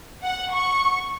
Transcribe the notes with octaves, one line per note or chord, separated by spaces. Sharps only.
F#5
C#6